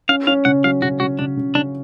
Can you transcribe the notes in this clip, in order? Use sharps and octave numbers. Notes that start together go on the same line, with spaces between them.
C#4 F5
C#4 F5
C#3 F#5
F#3 F5
C#3 F#4
C#3 F#4
C#3 D4
C#3
C#3 D4